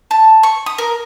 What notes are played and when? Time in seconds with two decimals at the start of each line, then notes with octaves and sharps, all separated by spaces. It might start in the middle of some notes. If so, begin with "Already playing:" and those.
0.11 A5
0.43 C#6
0.66 D#6
0.78 A#4